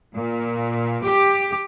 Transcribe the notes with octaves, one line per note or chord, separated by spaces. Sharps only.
A#2
G4